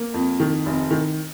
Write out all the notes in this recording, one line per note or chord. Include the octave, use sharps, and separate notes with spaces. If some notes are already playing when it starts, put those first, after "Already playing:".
Already playing: A#3
F2
D#3
F1
D#3